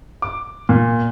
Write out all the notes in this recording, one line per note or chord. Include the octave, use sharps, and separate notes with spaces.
D6
A#2